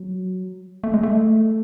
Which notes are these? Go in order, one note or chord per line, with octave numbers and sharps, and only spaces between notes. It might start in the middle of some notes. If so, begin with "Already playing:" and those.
Already playing: F#3
A3
G#3
A3